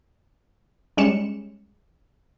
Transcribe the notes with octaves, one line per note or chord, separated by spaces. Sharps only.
G3 G#3 C#4 C#7 E7